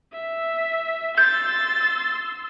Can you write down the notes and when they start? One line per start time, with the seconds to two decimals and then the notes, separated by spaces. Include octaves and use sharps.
0.13 E5
1.18 C6 E6 G6 A6